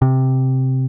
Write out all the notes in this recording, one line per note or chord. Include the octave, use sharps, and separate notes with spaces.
C3